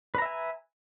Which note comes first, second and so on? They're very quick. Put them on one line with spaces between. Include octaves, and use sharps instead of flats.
B4 A#5 E5 G#5